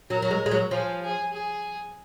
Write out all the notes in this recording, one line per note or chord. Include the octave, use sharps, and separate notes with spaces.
F#3 A#4
F#3
G#3
G#3
F#3
F3 G#4
G#4
G#4